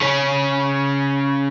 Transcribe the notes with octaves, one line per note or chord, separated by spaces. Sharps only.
C#3 C#4